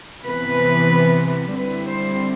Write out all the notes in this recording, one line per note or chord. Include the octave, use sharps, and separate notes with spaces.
C3 E3 B3 B4
D3 G3 C4 E4 B4
C5